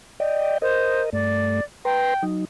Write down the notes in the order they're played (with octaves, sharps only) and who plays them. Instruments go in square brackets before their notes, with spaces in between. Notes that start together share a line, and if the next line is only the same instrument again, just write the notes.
[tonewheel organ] D5 D#5 G5
[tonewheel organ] A#4 D#5 [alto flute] C5
[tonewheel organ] G2 A3 [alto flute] D5
[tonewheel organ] B4 A#5 C6 [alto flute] G5
[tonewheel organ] F#3 D#4